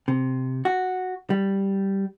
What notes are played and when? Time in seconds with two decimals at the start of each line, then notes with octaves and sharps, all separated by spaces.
0.08 C3
0.65 F#4
1.30 G3